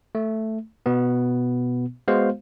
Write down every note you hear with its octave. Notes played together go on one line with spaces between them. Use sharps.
A3
B2 B3
G#3 B3 F#4 C5 F5